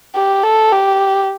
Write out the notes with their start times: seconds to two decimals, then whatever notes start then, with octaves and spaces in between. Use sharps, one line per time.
0.15 G4
0.43 A4
0.72 G4